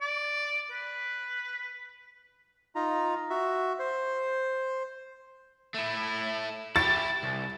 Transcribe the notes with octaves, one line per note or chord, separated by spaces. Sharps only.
D5
B4
D#4 F4 A#5
F#4 E5
C5
A3 E4
E4 G4 A6
C2